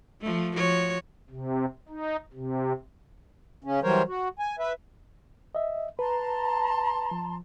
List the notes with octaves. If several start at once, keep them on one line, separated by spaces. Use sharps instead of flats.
F3 A3
F3 F#4 C#5
C3
D#4
C3
C#3 C#4
E3 F#3 G3 A#4 C5 C#5
F#4
G#5
B4 E5
D#5 E5
B4 A5 A#5 C6
F3